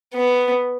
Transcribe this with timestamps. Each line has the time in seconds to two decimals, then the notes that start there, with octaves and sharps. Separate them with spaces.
0.15 B3